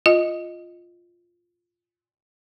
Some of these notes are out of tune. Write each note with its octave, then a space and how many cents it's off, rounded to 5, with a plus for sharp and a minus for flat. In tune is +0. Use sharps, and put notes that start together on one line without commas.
F4 +0 D#5 +0